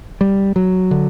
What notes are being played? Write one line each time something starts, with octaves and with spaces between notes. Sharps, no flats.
G3
F#3
D3